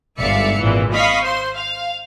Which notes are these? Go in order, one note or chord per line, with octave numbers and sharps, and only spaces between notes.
G1 G#2 D5 E5 F5 C#7
G#1 A#2 E3
D#5 F5 B5 C#6 D#6
C5 C6
F5